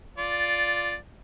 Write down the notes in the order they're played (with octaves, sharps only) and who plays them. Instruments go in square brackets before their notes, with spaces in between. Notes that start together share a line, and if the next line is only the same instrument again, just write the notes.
[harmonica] F4 D5